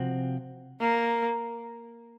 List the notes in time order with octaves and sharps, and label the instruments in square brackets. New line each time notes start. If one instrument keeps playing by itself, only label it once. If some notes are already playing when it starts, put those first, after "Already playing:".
Already playing: [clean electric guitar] C3 F3 C4 F#4
[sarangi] A#3